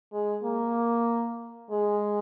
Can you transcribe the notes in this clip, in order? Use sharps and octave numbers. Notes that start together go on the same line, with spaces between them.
G#3
A#3
G#3